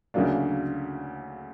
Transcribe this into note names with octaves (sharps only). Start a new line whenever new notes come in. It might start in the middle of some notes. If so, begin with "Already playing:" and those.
D2 C#3 F#3 A#3 D4